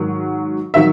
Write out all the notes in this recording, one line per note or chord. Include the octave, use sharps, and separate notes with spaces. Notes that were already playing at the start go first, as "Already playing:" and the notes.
Already playing: G#2 D#3 F#3
D#3 F#3 E5